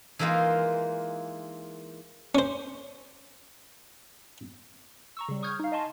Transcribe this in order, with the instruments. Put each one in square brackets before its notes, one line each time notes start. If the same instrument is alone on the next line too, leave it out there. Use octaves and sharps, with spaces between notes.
[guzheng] E3 G#3 A#3 D#4 F4
[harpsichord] C#4 C5
[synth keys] A#5 C#6 E6
C#3 G3
C#6 D#6 F6 G6 G#6
D#4 F5
D#5 F5 G#5 A5 C6 C#6